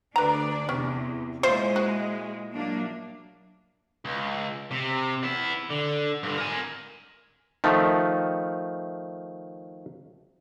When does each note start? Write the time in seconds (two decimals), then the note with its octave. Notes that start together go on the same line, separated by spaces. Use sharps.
0.16 D2 D4 B4 D5 A#5
0.69 E2 C3 C#4
1.43 A#2 G#3 E4 F4 C5
1.76 F#4
2.53 F#3 A#3 D4
4.05 C#2
4.72 C3
5.24 B3 E4
5.71 D3
6.23 G2 D3
6.37 A#4 G#5
7.64 D#3 F3 A3